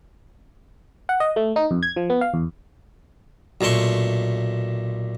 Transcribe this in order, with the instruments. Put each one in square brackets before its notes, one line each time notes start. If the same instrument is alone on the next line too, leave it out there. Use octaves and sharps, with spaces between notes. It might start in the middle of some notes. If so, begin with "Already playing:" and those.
[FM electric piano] F#5
D#5
A3
D#4
F2
G#6
F3
B3
F5
E2
[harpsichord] B1 A#2 A3 C6 C#6